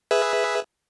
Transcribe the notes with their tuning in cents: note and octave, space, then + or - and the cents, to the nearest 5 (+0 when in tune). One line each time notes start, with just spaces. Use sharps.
G#4 +0 B4 +0 E5 +0